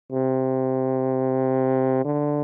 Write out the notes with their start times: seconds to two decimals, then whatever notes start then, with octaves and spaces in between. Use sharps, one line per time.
0.12 C3
2.05 D3